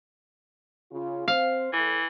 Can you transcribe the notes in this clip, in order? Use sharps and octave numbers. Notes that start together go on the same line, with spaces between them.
C#3 F4
C4 C5 F5
A2 E3 A4